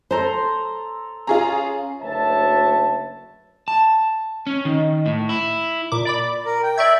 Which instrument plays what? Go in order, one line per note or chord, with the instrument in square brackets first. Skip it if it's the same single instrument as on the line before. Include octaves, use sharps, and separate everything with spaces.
[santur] A4 A#5 C6 [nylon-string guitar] C5
[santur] C#4 [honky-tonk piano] F4 G#4 A#5
[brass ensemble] F#1 D2 B4 C#5 E5 A5
[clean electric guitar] A5
C#4
D#3
A2
E4
[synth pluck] A#2 D6
D5 B5 D6
[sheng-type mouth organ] A#4
G5
[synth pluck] D5 C#6 G#6 [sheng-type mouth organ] E5